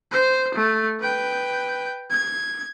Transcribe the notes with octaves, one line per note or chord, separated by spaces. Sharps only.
C5
A3
B4 G5
G#6